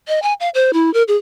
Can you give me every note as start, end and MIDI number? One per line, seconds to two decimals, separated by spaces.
0.08 0.20 75
0.23 0.33 80
0.40 0.49 77
0.55 0.71 72
0.73 0.92 64
0.94 1.03 70
1.08 1.16 68